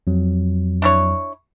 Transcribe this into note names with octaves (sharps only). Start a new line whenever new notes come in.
F2 F#3
D4 E4 C#5